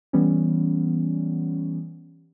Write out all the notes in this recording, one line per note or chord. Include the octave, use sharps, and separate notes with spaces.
E3 G3 B3 C#4